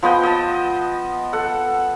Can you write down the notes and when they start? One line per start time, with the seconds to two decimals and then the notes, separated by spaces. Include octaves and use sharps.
0.03 F3 B3 D#5 G5
0.23 D#5 A5
1.33 A4 F#5